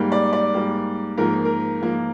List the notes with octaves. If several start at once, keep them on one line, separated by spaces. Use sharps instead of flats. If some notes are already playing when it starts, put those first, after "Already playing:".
Already playing: G#2 G3 A#3
D5
D5
G#2 G3 A#3
G#2 F3 A#3 A#4
A#4
G#2 F3 A#3